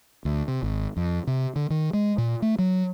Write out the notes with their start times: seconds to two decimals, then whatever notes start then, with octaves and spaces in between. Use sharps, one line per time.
0.25 D2
0.48 C3
0.63 G#1
0.97 F2
1.27 C3
1.56 D3
1.70 D#3
1.93 G#3
2.18 A#2
2.42 A3
2.59 F#3